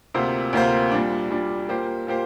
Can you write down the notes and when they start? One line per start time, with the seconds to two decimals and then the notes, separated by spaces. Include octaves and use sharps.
0.14 D2 C3 A#3 F4 C5
0.53 D2 C3 A#3 F4 C5
0.92 A#2 G3 D4
1.30 A#2 G3 D4
1.69 A#2 A#3 G4 C5
2.07 A#2 A#3 G4 C5